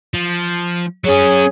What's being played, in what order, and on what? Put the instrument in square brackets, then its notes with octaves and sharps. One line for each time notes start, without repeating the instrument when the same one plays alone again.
[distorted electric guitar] F3
[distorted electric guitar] F#3 C#4 [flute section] G#4 C#5